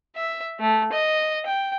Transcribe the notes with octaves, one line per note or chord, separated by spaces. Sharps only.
E5
A3
D#5
G5